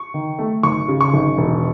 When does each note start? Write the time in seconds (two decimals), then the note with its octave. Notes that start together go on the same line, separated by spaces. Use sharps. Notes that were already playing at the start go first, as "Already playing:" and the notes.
Already playing: C#6
0.14 D#3
0.39 A3
0.63 G#1 C#6
0.88 C#3
1.01 C#6
1.14 G#1
1.38 E1